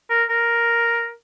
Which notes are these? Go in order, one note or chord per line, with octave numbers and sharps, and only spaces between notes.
A#4
A#4